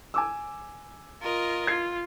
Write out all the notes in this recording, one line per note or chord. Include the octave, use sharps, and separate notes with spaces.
G#5 D6 E6
F4 A#4 D#5
F4 G#6 C7